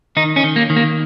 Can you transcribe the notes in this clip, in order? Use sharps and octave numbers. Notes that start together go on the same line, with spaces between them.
D#3 D#4
C#4
D#3
A#3
D#3
A#3